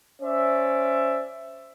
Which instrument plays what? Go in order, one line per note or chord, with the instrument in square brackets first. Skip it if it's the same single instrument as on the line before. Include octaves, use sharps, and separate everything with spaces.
[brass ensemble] C#4 C5 D5 E5